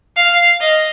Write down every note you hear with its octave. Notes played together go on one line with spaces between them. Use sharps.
F5
D#5